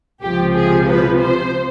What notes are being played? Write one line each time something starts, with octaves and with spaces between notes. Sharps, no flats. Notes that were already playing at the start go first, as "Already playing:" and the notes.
C#2 C3 F3 G4
G#4
B4
C5